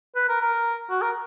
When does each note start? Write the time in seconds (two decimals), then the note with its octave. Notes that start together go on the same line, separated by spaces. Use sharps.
0.16 B4
0.29 A#4
0.41 A#4
0.90 F#4
1.02 A#4